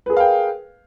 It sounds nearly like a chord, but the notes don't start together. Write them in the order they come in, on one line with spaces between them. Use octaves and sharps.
B4 G#4 A#4 F5 G5